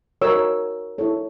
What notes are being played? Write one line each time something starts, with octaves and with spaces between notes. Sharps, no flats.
F#4 A#4 C#5 E6
E4 A4 C#5